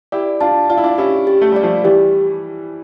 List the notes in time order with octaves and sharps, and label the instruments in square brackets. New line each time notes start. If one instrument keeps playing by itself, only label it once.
[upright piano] E4 G4 [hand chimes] D5
[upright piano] D4 F4 [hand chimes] A5
[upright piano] F4 [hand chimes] D5
[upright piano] E4
D4 F4
[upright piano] C#4 E4 [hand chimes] G4
[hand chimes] G4
[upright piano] A3
[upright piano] G3 [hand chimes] D5
[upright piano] F3 A3
[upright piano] E3 G3 [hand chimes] G4